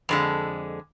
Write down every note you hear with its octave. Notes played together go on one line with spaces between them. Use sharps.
F2 D3 G#3